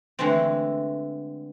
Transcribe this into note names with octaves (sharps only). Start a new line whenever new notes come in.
D3 E3 G#3 A3 C4